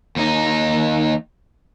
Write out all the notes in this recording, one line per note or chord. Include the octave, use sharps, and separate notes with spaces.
D#2 D#4